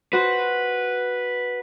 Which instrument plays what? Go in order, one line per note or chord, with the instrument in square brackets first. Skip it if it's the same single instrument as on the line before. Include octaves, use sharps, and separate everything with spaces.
[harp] F#4 C5 [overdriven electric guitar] B4